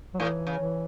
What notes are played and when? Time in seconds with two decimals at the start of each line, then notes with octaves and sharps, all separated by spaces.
0.14 F#3
0.20 A2 E3
0.47 C#3
0.59 E3